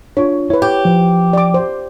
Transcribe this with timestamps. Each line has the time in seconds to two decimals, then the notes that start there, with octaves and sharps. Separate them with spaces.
0.17 D4 F4 C#5
0.50 E4 B4 C#5
0.62 G4 C#5
0.85 F3
1.33 D5 D6
1.54 C5